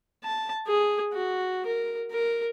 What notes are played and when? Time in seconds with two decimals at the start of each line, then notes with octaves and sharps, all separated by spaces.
0.23 A5
0.67 G#4
1.12 F#4
1.66 A#4
2.11 A#4